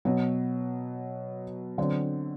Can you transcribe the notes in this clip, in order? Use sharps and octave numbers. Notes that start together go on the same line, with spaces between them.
B2 F#3 B3
D3 F#3 C4